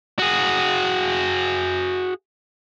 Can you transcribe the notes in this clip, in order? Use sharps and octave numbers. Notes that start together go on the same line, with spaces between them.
F#4 G#4